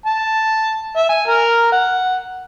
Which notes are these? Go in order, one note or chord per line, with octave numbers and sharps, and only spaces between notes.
A5
E5
G#5
A#4
F#5